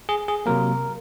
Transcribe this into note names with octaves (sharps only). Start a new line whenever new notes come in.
G#4
G#4
C3 F#3 A#3 A#4